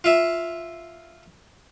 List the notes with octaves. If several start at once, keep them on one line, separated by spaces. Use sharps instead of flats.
F4 E5